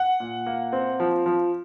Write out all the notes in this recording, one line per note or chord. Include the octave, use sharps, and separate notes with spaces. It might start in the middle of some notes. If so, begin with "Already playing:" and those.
Already playing: F#5
A#2
A#3
C4
F3
F3